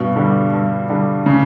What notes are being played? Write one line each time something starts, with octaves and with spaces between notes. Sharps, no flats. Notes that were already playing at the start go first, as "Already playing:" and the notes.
Already playing: G2 B2
D3 G3
G2
D3 G3
C#3